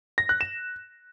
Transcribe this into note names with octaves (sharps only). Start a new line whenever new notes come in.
A#6
F#6
E7